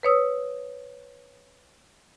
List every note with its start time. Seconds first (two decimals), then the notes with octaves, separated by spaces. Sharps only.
0.03 B4 C#5 D#6 E6